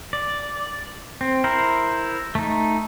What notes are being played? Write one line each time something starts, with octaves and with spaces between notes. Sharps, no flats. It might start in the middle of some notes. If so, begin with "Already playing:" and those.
D5
C4
E4 A#4 C5
A3 D#4